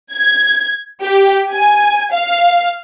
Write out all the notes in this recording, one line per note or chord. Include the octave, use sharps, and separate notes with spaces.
G#6
G4
G#5
F5